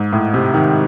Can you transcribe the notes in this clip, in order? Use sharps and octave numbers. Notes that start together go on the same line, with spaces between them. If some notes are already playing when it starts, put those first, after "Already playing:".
Already playing: G#2
A2
C3
D#3